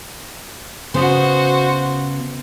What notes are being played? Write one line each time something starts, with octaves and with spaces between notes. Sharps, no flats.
C#3 B3 F#4 C5